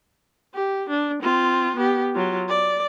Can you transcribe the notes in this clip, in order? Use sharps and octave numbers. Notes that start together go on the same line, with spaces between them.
G4
D4
C4 F4
B3 G4
F#3 F4
D5